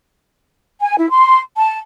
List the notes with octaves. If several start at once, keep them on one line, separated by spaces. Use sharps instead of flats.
G#5
E4
C6
A5